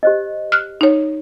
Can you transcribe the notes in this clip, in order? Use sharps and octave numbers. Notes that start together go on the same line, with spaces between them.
G4 C5 D#5
F6 F#6
D#4 C#5